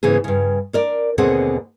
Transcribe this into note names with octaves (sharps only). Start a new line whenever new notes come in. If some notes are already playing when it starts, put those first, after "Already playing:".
G#2 C#3 E3 B3 G#4
G2 C#3
D4 A#4 D5
D#2 B2 D3 C4 G#4 F#5